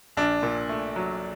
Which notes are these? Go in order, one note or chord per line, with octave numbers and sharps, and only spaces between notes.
A#1 D4
A#2
A3
F#3